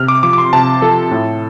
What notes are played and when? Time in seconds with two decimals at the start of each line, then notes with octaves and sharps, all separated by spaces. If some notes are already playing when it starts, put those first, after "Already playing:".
Already playing: C3 F6
0.08 D6
0.23 F3 D6
0.33 D6
0.38 C6
0.53 C3 A5
0.82 F3 A4
1.11 A2